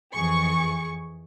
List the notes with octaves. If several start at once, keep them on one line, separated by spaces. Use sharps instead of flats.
F2 E3 G#4 C#6